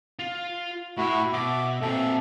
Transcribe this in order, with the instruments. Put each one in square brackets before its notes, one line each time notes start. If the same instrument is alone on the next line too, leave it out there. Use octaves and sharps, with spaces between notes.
[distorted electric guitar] F4
[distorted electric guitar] A2 E5 [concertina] E4 F#4
[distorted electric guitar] B2 [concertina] E5 D6
[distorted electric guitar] A#2 C4 [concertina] A4 E5